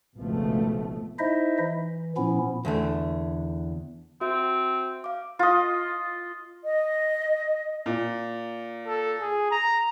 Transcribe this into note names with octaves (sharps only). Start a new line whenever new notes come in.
G#1 C#2 B2 F3 A3
D#4 E4 C5 D#5 E5
E3
A#2 F3 B3 C#4 E4
E2 D3 A3
C4 F#4 E5
F5 D6
F4 D#5
D#5
A#2
A4
G#4
A#5